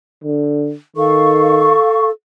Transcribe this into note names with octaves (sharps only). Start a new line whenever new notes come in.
D3
D#3 A4 F5 C#6